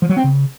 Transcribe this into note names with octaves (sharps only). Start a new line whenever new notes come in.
F3
F#3
C4
C#3